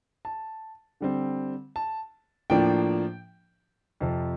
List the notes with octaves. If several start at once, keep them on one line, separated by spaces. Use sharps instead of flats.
A5
D3 G3 C4
A5
A2 F3 A#3 D4 G5
F2 C3 F3